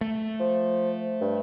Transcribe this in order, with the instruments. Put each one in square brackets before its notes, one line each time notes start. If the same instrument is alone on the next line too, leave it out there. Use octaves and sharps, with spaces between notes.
[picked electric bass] A3
[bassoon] F3
G2